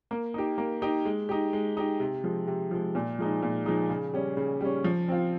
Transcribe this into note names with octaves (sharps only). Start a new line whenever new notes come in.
A#3
D#4 G4
A#3
D#4 G4
G#3
D#4 G4
G#3
D#4 G4
C3
F3 G#3
C3
F3 G#3
A#2
F3 G#3 D#4
A#2
F3 G#3 D#4
C#3
G3 C#4
C#3
G3 C#4
F3
C4 F4